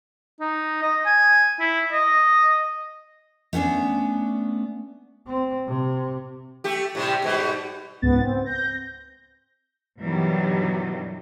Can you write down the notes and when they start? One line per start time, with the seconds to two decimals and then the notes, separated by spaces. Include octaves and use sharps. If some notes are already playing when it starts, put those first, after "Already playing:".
0.40 D#4
0.82 D#5
1.06 G#5
1.60 E4
1.92 D#5
3.53 A3 B3 C#4 D4
5.27 C4
5.68 C3
6.64 A3 G4
6.95 A2 C3 G3
7.22 G#2 B2 G3
8.02 C#2 G#2 B3 A6
8.21 C4
8.46 G6 A#6
10.00 G2 B2 D#3 E3 F#3 G3